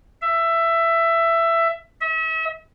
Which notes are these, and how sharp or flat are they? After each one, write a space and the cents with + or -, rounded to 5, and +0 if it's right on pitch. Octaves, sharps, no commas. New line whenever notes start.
E5 +15
E5 -40